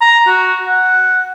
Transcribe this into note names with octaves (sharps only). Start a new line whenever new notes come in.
A#5
F#4
F#5